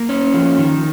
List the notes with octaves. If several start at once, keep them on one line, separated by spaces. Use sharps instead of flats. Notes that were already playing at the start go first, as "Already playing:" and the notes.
Already playing: A#3
C#4
F3
D#3